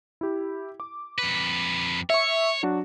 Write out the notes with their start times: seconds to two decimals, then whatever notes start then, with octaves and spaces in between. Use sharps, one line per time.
0.21 E4 G4
0.80 D6
1.18 F2 B4
2.10 C#5 E5 C#6
2.63 F#3 D4 F#4